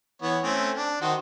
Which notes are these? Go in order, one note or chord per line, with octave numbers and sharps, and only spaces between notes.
E3 B3 C#5
A3 C4 C#4
D4
D#3 F#4 C5